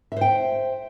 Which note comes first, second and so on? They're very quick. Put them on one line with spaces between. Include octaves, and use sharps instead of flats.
E5 C5 G5